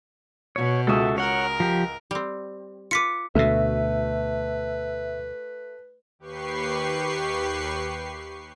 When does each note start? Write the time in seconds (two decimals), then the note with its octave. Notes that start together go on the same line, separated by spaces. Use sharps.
0.56 B2 C#5
0.87 C#2 F#4 A4 E5 D#6
1.18 A#4 C#5 F#5
1.60 F3 G4
2.11 G3 C4
2.91 F4 B4 D6 B6 C#7
3.35 D2 B2 A3 B4 E5
6.19 D#2 G4 B4 C#6 C7